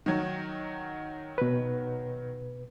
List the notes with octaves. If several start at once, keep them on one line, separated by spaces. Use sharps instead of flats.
D#3 F#3
B2 B4